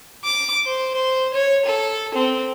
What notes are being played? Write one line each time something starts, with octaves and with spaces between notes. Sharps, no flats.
D6
C5
C5
C#5
A4
C4